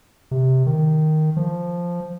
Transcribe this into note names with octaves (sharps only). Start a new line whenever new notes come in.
C3
D#3
F3